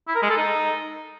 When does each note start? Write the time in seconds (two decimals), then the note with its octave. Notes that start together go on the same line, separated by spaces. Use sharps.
0.08 E4
0.15 A#4
0.23 G#3
0.30 A4
0.37 D#4